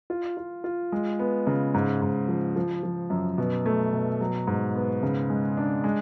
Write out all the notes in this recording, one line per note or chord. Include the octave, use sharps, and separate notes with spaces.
F4
F4
F4
G#3
B3
C#3
G#2
G#2
F3
F3
F3
F#2
B2
A3
B2
F#3
G#2
B3
C#3
G#3
D4
G#3